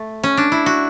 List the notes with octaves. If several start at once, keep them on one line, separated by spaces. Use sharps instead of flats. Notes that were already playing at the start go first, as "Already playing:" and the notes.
Already playing: A3
C#4
D4
E4
F#4